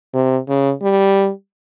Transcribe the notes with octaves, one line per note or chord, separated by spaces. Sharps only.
C3
C#3
G3